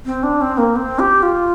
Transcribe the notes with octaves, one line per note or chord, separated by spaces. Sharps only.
C4
D4
C4
A#3
C4
G4
F4